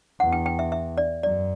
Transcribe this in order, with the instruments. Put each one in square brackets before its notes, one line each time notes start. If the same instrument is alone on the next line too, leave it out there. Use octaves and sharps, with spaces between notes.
[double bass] E2 [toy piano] F#5
[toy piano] G5
G5
E5
E5
D5
[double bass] F#2 [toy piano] D5